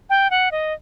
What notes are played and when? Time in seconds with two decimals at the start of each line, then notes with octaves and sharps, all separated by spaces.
0.10 G5
0.30 F#5
0.52 D#5